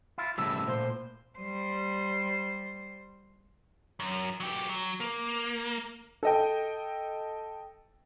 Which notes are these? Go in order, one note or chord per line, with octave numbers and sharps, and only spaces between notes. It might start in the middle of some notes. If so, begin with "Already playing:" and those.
E4 F4
A2 C#3 F3 G3 E6
A#2 C5
G3 C5
F#2
F#3 G4
F#3
A#3
A4 D#5 G5